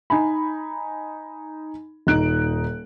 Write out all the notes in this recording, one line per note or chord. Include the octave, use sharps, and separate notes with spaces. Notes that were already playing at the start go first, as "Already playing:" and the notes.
D#4 G#5 B5
D#1 D#4 F#6 D7